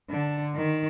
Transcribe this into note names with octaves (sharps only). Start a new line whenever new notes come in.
D3
D#3